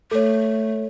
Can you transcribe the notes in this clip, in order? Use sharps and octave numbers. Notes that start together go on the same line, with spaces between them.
A3 A4 C#5